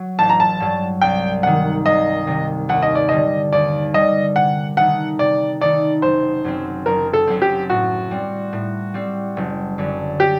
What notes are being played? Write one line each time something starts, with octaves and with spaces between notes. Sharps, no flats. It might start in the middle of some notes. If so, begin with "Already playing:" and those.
Already playing: F#3
A1 A5
A#5
A5
G2 F#3
C2 G5
C3 D#3 F#5
C2 D#5
C3 D#3
D#2 F#5
D#5
D5
D3 G3 D#5
D#2 D5
D3 G3 D#5
C3 F#5
D#3 A3 D#4 F#5
C3 D5
D#3 A3 D#4 D5
F#1 C5
F#2 F#3 C4
F#1 A#4
A4
F#2 F#3 C4
G4
A2 F#4
G3 C4
A2
G3 C4
F#1
F#2 D3
G4